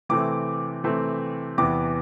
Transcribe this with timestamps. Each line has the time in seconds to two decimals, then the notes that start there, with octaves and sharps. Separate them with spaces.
0.09 C3 E3 A3 C4 D6
0.84 C3 E3 A3 C4
1.58 E2 C3 E3 B3 D6